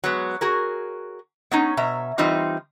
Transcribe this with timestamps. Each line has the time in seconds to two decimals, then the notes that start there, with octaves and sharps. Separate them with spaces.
0.04 F#3 G#3 B3
0.41 F#4 G#4 A#4
1.51 B3 C#4 D#4
1.77 B2 E5 A#5
2.18 E3 G3 C4 D#4 F4